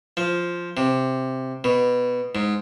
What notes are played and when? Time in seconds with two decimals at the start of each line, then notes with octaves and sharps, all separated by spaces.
0.17 F3
0.77 C3
1.64 B2
2.35 G#2